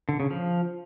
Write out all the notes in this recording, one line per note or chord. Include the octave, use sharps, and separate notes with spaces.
D3
C#3
F3